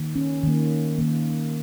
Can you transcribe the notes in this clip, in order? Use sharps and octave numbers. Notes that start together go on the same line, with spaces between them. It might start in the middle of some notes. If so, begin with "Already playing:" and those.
Already playing: D#3 A#3
C#4
D#3 A#3
D#3 A#3